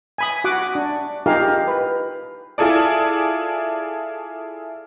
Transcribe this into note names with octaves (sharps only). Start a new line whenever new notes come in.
G#5 B5 D#6
F#4 F#5 D6
D4
D#4 F4 G4 G#4 A#4 F5
B4
E4 F4 G#4 A4 D5